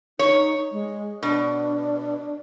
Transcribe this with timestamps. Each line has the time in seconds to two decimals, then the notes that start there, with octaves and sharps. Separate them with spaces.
0.19 D#4 C#5
0.72 G#3
1.23 B2 D4